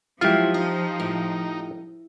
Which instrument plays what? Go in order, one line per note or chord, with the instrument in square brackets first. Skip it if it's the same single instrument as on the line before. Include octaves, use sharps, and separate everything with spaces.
[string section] F3 [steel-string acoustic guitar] F#3 G#3 E4 [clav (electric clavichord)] F4 G4
[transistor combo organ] D#4 [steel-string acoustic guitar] D#5
[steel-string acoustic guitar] A2